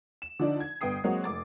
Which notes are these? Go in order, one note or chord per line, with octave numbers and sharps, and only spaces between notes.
E7
D3 F3 D4 D#4 D5
G#6
G1 B3 G5 D#6 C7
F#3 G#3 A#3 C4 C#5 F#5
F1 D6 A6